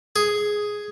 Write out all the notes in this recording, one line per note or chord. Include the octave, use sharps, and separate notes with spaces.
G#4